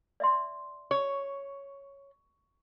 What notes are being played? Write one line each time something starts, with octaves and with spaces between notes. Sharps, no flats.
D5 E5 C6
C#5